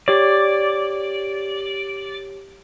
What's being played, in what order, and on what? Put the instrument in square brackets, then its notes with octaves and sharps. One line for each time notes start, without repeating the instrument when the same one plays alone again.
[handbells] G4 C#5 [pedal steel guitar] D5